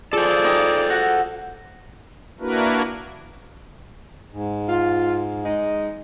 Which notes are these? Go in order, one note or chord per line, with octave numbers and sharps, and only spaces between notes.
F4 G#4 A4 C5 D5
D#4 G4 D#6
F#4 F#5
A#3 D4 E4 F#4 A#4 B4
G#2
F4
G#3 D#4